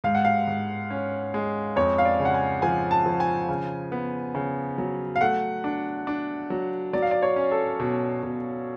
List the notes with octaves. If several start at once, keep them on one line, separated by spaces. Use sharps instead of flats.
G#2 F5
F#5
F5
G#2
C#4
G#3
F2 C#5
F5
D5
C#3
F#5
G#5
F3 G#5
A5
F3
G#5
C#3
B3
C#3
F#3
F5
A3 F#5
D4
D4
F#3
F#3 D5
F5
D5
C#5
C#4
A4
B2
B2